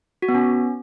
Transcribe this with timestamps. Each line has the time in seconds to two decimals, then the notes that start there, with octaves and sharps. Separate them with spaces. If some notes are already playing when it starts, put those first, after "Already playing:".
0.22 F#4
0.29 B3
0.35 C#4